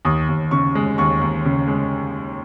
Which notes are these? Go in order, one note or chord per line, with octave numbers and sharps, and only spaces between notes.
D#2 D#6
D#2
C#3 C#6
G#3
D#2 C#6
D#2
C#3
G#3